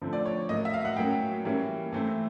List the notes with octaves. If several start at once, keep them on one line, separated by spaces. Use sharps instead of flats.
D3 F3 A3 C4
D5
C#5
A2 F#3 A#3 D#5
E5
F5
F#5
A2 F#3 A#3 C#4 G5
E3 G3 A#3 C#4
E3 A3 C4